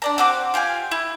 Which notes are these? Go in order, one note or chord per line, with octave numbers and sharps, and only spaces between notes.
D4 D5 A#5
C4 F#4 D6
F4 G4 F5 G#5
E4